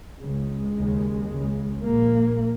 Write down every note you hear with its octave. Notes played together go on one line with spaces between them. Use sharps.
C#2 C#3 G#3
D#2 C#3
C#2 C#3
A#1 A#2 A#3